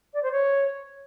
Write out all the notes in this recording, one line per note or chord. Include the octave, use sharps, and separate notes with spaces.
D5
C5
C#5